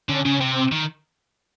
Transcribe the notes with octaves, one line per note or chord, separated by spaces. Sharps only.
D3 C#4
C#3 C#4
C3 C4
D#3